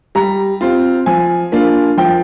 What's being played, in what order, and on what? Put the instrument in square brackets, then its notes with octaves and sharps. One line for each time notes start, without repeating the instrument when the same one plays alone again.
[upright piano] G3 A#5
C4 F4
F3 G#5
A#3 D4 F4
F3 G5